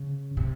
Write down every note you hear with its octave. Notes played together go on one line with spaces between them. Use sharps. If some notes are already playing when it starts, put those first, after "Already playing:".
Already playing: C#3
C3